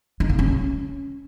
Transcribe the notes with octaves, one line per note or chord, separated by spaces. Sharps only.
D#4
A#3
C#4